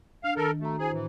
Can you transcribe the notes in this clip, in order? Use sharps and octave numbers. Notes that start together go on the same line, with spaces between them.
D4 F5
D#3 A4 A#4
A3 F#4 A#5
E4 G#4 C5
A2 E3